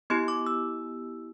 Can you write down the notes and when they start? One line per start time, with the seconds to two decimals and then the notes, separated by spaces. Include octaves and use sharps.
0.10 B3 E4 G4 C6
0.28 D6
0.47 E6